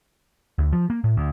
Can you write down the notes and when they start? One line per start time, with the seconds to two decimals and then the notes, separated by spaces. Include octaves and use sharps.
0.58 D2
0.72 F3
0.90 A#3
1.04 A2
1.17 D2